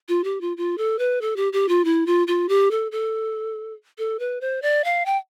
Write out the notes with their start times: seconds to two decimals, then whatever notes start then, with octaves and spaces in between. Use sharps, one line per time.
0.09 F4
0.24 G4
0.41 F4
0.57 F4
0.78 A4
0.99 B4
1.21 A4
1.36 G4
1.53 G4
1.69 F4
1.85 E4
2.06 F4
2.27 F4
2.49 G4
2.71 A4
2.92 A4
3.98 A4
4.19 B4
4.41 C5
4.62 D5
4.84 F5
5.06 G5